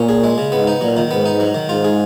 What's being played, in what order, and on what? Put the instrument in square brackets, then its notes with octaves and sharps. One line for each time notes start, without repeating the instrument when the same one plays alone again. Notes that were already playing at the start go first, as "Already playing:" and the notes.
Already playing: [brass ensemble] A#2 [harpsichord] C#4
[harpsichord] G#4
G#3
C#3
[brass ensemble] G#2 [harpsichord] B3
[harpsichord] D#4
[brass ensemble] A#2 [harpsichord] F#3
[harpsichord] D#3
[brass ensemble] G#2 [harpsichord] B3
[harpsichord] D#4
F#3
D#3
[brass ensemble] G#2 [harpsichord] F4
[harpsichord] G#4